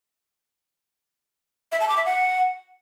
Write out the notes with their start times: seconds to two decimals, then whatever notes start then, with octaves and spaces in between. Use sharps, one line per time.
1.72 E5
1.80 A5
1.89 D6
1.97 E5
2.05 F#5